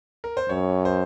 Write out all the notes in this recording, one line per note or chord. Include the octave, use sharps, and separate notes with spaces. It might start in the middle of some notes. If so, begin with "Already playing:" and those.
A#4
C5
F#2 C#5
C5